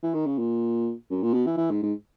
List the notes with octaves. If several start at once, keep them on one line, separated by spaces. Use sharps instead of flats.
E3
D#3
C#3
A#2
F#2
A#2
B2
E3
E3
G#2
G#2